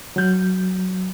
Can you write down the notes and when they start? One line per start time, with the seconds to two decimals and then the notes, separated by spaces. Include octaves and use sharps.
0.16 F#3 G6